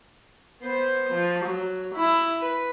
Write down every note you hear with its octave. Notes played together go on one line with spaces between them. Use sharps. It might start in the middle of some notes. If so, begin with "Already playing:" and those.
B3 C5
F3
F#3
E4
B4